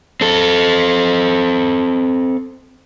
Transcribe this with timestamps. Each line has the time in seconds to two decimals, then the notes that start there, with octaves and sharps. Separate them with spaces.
0.21 C4 A4